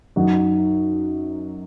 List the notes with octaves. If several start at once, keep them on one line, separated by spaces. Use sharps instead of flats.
F#2 F#3 D#4 F#4